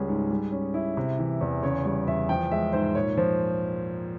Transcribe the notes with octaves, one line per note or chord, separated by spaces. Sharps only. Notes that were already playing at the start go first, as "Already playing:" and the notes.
Already playing: C#2 G3 C#4 G#4
G#2
G3
C#4
E4
C3
E3
E2
C#3 C#5
G3
E2 E5
F3 G5
G#3 E5
G#2 C5
A#2 C#5
F3 C5